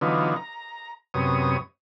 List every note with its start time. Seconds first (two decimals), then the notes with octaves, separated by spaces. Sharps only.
0.01 D3 E3 F#3 B3 D#4 F4
0.36 A#5
1.14 F#2 C3 B3 C#5 D#6